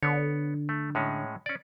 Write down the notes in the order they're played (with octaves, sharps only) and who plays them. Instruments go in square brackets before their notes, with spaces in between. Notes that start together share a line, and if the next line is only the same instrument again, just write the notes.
[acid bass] D3 [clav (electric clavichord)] B3 C#5
[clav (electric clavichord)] A3
A2 G#3 C#4
C#4 D5